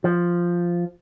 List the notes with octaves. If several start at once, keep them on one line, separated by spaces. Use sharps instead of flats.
F3